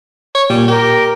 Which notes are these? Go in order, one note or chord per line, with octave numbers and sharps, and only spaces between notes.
C#5
A#2 G3
G4 A#4